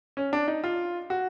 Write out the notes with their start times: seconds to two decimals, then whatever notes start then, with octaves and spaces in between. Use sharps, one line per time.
0.17 C#4
0.33 D4
0.48 D#4
0.64 F4
1.10 F#4